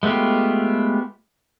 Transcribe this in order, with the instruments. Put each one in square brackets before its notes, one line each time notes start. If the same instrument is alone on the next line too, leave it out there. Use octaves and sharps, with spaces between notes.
[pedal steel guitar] G#3 A3 B3 F4 G4